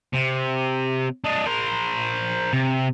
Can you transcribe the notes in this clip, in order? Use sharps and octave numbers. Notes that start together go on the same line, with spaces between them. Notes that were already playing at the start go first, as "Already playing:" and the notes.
C3
D4 D#5
A#4 C5
C3